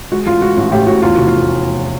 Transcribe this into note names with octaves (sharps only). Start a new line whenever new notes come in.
G#3 F#4
A1 F4
G#3 F#4
A1 F#4
A2 G4
A2 F#4
E2 F4
F1 F#4
F4